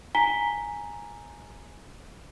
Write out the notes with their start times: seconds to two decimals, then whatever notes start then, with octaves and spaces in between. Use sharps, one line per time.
0.15 G#5 A#5 B6 G7